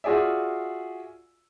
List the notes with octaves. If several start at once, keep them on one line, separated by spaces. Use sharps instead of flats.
F4 F#4 G#4 D5 E5